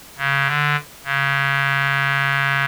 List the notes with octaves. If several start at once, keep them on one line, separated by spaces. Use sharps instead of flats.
C#3
D3
C#3